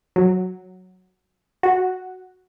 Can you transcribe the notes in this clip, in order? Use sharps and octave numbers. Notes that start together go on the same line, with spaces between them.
F#3
F#4